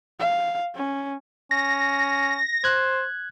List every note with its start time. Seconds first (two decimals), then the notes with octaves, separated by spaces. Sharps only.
0.20 F5
0.76 C#4
1.51 C#4 A#6
2.64 C5 F#6 G#6